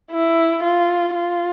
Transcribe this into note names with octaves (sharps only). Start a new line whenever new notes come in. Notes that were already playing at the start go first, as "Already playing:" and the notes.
E4
F4
F4